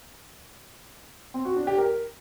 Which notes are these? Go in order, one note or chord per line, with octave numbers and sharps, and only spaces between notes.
C4
F#4
D4
G4
A#4